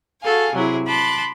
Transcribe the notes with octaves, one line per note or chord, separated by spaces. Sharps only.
F#4 G#4 A4 F5 G#5
C3 F#3 E4 G#4
A5 B5 C6 D6 F#6